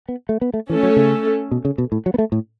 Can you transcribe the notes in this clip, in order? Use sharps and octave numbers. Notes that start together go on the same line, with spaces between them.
B3
A3
B3
A3
E3 A3 C#4 A4
F#3
C#3
B2
C#3
B2
A2
F#3
B3
A3
A2